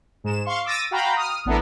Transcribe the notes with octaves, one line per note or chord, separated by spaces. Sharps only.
G#2 E7
F5 C6 C#6
D6 E6 A6 A#6 D#7
F#4 F5 G5 A#5 B5
D#6 F6
A1 B3 D4 E4 A4 A#4